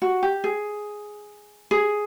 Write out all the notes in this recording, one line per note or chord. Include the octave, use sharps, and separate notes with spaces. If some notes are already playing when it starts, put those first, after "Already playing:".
F#4
G4
G#4
G#4